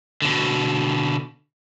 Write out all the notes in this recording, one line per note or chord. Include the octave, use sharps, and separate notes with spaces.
B2 D3